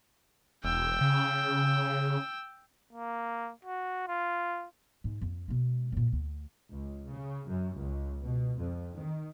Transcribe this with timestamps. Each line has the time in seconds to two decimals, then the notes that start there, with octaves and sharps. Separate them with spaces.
0.64 E1 G5 E6
1.01 C#3
2.93 A#3
3.64 F#4
4.08 F4
5.04 G#2
5.21 F2
5.48 B2 G#3
5.92 F#2 A#2
6.12 D2
6.69 C#2
7.10 C#3
7.48 F#2
7.77 C#2
8.21 B2
8.57 F2
8.96 D#3